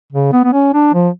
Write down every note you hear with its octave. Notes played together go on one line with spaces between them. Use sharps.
C#3
B3
B3
C#4
D4
F3